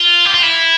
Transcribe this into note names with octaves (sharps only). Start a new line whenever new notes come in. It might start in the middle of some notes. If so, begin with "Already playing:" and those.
Already playing: F4
G4
F4
E4